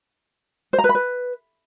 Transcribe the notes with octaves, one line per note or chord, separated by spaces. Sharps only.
C5
A#5
B4
B5
B4